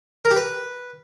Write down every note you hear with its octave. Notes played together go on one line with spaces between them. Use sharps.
A#4
G4
B4